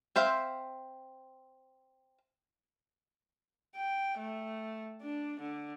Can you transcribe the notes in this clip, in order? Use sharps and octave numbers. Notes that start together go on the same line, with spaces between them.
C4 C5 E5 F5
G5
A3
D4
D3